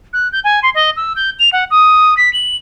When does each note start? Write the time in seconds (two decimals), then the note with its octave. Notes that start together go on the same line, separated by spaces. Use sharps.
0.13 F#6
0.32 G6
0.44 G#5
0.63 C6
0.75 D#5
0.97 E6
1.16 G6
1.39 F7
1.53 F#5
1.71 D#6
2.17 B6
2.33 F#7